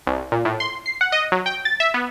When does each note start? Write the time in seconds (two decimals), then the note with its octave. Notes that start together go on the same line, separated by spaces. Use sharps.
0.07 C2
0.32 A#2
0.45 A2
0.60 C6
0.86 C7
1.01 F#5
1.12 D#5
1.32 F#3
1.46 G5
1.65 A6
1.80 E5
1.94 B3